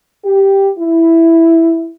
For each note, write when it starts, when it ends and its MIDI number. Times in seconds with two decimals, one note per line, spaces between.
0.25 0.69 67
0.79 1.92 64